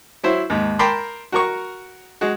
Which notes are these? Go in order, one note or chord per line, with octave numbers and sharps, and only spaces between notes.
F#3 E4 C5 E5
D#2 G#2
A#4 G5 A5 B5 C6 D6
F#4 A#4 C#6
G#3 F#4